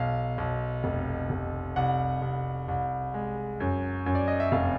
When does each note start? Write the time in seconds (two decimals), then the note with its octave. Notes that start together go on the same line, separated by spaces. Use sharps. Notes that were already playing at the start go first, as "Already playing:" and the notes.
Already playing: B1 F5
0.38 B1
0.84 F1
1.30 F1
1.76 C2 F#5
2.22 C2
2.68 C2
3.14 G#3
3.60 F#2
4.06 F#2
4.15 D5
4.28 D#5
4.40 E5
4.52 F1 F5